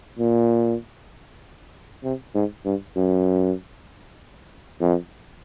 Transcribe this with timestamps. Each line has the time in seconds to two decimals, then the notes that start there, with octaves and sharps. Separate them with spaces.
0.19 A#2
2.04 C3
2.34 G#2
2.65 G2
2.96 F#2
4.80 F2